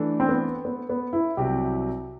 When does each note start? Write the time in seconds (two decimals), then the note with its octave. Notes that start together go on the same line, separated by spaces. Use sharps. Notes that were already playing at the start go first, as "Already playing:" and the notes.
Already playing: E3 A3 D4 A4
0.20 C4
0.29 B3
0.65 B3
0.89 B3
1.13 E4
1.37 C2 C3 F#3 G4